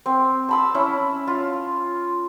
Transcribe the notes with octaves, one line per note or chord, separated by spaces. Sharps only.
C4
A5 B5 E6
C#4 E4
F4